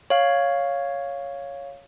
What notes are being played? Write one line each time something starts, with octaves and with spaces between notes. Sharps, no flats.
C#5 F5